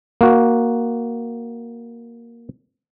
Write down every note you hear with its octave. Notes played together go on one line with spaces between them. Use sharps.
A#3 F#4